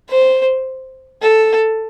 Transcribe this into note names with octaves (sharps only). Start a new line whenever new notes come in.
C5
A4